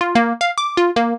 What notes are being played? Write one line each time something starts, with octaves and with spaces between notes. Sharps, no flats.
F4
A#3
F5
D6
F4
A#3